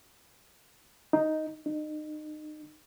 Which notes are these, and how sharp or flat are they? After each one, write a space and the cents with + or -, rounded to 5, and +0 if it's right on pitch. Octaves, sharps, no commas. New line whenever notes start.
D#4 +5
D#4 -30